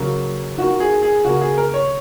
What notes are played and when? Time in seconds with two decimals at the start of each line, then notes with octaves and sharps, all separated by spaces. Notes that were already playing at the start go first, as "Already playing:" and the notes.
Already playing: C#3 F#3 A#3
0.58 D#3 A#3 F#4
0.80 G#4
1.03 G#4
1.24 C#3 A#3 F#4
1.41 G#4
1.58 A#4
1.74 C#5